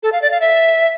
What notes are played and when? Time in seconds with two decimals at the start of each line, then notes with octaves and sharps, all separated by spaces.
0.03 A4
0.12 F5
0.22 D5
0.31 F5
0.41 E5